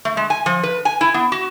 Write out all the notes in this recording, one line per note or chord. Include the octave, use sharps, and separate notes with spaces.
A3
G#3
G#5
F3
B4
G#5
E4
B3
F#4